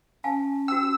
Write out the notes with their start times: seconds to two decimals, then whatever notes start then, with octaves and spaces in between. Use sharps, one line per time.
0.24 C#4 F5 G#5 A5
0.68 F#4 G5 E6